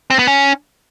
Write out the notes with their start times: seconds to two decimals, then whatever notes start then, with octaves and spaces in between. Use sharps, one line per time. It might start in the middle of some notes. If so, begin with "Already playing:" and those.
0.10 C4
0.19 B3
0.27 C#4